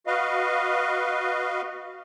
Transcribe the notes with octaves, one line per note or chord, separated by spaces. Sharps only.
F#4 B4 D#5 F5